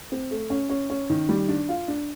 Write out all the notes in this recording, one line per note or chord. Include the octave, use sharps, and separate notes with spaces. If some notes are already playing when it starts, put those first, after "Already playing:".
C4
A3
C#4
C#4
C#4
D#3
G3
D4
F4
D4